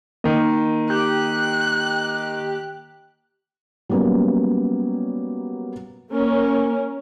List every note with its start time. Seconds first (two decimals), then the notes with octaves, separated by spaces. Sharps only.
0.24 D#3 A#3 D#5
0.90 G4 F#6
3.90 F#3 G3 A#3 B3 C#4
6.11 A#3 C#4 A#4